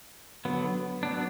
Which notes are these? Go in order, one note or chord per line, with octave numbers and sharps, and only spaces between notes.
D3 F#3 B3
F#3 B3 D4